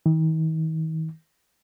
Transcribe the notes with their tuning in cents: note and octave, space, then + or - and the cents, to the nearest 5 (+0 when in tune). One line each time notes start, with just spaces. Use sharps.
D#3 +40